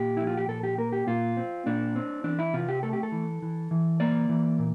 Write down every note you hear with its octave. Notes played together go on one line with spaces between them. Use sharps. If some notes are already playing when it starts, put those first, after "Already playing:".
Already playing: A#2 G4
F3 E4
F4
G4
A#2 A4
G4
A#3 A#4
G4
A#2 F4
C4
A#2 D4
C4
E3 D4
E4
C3 F4
G4
A3 A4
G4
A4
E3
E3
E3
A#3 D5
E3
A#2